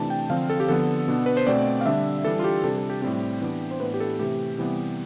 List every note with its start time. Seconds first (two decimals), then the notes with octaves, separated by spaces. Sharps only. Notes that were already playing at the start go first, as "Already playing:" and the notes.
Already playing: C3 E3 A3 D4 A5
0.10 G5
0.30 D3 F3 C4 F5
0.50 A4
0.60 G4
0.68 D3 F3 B3 A4
1.08 B2 B3 D4
1.26 B4
1.37 C5
1.47 B2 A3 C4 D5
1.81 F5
1.86 D3 G3 D4 E5
2.24 E3 G3 D4 A4
2.39 F4
2.44 G4
2.64 C3 G3 D4 A4
2.76 A4
2.90 G4
3.02 A2 G3 C4 G4
3.41 E3 B3 D4
3.71 C5
3.80 A2 E3 B3 D4 B4
3.94 G4
4.00 A4
4.19 C3 E3 A3 G4
4.58 C3 E3 G3 B3